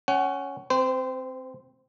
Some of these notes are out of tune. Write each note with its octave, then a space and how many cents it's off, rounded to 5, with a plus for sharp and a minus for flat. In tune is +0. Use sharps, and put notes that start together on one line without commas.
C#4 +5 F#5 +30
C4 +5 C5 -25